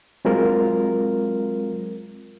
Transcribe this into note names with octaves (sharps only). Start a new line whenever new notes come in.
F#3 G#3 C4 F4 A#4